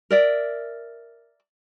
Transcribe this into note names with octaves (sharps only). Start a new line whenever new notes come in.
A#4 D5 E5